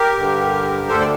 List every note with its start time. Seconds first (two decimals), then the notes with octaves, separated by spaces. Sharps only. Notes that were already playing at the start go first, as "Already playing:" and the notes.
Already playing: G4 A#4
0.15 G2 D3
0.89 D2 D3 A4 C5
1.01 D5